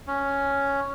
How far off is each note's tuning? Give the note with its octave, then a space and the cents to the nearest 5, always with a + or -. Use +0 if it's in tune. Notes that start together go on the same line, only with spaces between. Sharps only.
C#4 +5